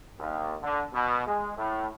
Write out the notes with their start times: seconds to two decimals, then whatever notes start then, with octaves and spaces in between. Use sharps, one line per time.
0.20 D#2
0.62 D3
0.94 B2
1.27 G#3
1.57 A2